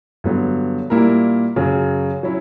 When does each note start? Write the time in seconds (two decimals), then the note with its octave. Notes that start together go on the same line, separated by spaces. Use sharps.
0.24 G2 D3 F#3 B3
0.90 A#2 G3 A#3 E4 A#4
1.56 F#2 C#3 F#3
2.23 F#3 C#4 E4